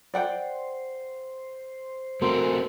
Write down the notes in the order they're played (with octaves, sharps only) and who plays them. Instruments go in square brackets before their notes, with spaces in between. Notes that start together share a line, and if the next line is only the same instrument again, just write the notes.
[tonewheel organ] C5 [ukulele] D5 F#5 G5
[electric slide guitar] A3 C4 [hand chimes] F#4 A#4 C6